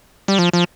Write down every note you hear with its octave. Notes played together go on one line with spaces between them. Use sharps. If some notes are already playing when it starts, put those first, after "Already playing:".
G3
F3
F3